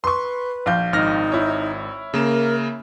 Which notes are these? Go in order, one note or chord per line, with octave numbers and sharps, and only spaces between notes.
B4 C6 C#6
A#1 F5 G6
G#1 D#4 F6 A#6
E4 C#5
C#3 A#3 A#4 E7